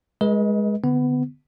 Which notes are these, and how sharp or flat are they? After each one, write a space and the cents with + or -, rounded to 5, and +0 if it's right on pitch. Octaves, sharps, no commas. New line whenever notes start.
G#3 +0 B4 -35 D#5 +30
D3 +0 B3 +15